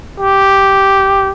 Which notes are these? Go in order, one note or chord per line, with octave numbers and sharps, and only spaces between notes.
G4